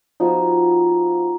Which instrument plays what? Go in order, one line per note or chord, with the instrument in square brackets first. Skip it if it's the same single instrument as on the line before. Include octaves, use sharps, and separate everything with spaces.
[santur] F3 B3 D#4 F#4